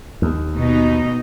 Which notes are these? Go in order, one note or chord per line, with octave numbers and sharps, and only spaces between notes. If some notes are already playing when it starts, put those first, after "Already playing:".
D#2
B2 D#4